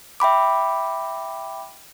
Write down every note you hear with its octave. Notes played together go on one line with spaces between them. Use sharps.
E5 G5 B5 D6